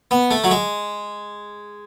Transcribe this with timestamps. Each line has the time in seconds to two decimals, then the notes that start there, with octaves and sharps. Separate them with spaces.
0.11 B3
0.31 A3
0.44 F#3
0.51 G#3